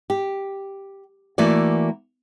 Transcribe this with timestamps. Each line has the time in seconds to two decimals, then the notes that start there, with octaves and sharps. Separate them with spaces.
0.10 G4
1.38 E3 A3 A#3 F#4 D5